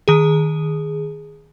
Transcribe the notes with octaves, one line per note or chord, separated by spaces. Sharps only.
D#3 G#4